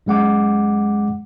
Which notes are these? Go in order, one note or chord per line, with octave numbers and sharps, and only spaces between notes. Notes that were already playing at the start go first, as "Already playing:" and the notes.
F#2 G#3 F#5 D6